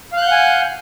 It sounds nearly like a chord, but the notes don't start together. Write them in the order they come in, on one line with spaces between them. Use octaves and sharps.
F5 F#6 G6 F#5 G#5